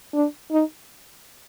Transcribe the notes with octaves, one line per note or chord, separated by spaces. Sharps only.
D4
D#4